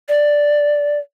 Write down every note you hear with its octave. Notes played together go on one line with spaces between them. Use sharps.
D5